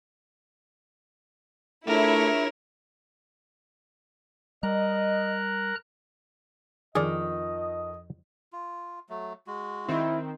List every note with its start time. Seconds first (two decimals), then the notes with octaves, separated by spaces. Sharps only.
1.87 A3 D4 E4 F4 G#4 A#4 C#5
4.63 G3 A#4 D#5 A#5 F#6
6.95 F2 D#3 G#4 D5 D#5
8.53 F4
9.09 F#3 A3
9.47 G#3 F#4
9.88 D#3 C4 E4